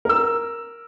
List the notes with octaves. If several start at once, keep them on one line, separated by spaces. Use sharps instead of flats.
A#4 E6